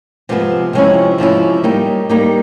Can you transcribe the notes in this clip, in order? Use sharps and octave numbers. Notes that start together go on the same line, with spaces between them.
C3 F3 G#3 B3
C3 F3 G#3 C#4 E4
C3 F3 G#3 C#4 E4
G3 A#3 D#4 G4
G3 A#3 D#4 G4